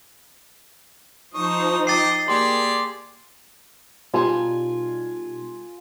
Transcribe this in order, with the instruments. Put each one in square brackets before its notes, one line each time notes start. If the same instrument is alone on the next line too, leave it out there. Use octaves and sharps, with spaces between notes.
[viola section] F3 D#4 C5 [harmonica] C#6 D#6
[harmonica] D#5 G5 D6 [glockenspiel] A6 C7
[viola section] A#3 [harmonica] G4 G#4 D5 [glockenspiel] C6 D6
[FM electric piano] B2 G3 D#4 [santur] F4 G#5 C6